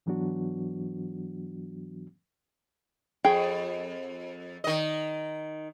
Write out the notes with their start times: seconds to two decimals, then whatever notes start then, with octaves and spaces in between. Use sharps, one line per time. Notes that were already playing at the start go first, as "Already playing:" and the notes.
0.06 G#2 E3 F#3 B3 D4 F#4
3.25 F2 G#4 G5
4.64 D#3 D#5